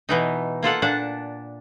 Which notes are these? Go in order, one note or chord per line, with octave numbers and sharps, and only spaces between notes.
B2 E3 D#4
A#3 F4 A4 F#5
A#2 D4 F#5 A5